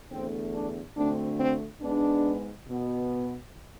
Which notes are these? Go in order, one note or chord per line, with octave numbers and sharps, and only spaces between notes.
E2 D3 A3 C4
D4
D2 D3 A3 C4 D4
C4
G#2 G#3 B3 D4
B2 B3